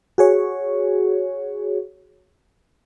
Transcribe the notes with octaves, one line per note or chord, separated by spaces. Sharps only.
F#4 G#4 C#5